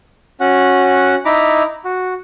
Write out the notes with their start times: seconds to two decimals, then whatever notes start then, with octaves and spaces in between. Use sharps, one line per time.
0.41 C#4 F#4 F#5
1.25 D#4 E4 A#5 B5 D6
1.85 F#4